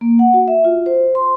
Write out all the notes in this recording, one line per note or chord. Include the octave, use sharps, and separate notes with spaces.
A#3
F#5
F#4
E5
F4
C5
C6